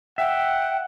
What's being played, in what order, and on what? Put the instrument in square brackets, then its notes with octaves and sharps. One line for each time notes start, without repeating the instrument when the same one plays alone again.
[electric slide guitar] E5 [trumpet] F#5 [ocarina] G5